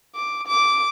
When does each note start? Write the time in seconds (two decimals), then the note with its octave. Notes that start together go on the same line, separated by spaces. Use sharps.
0.16 D6
0.47 D6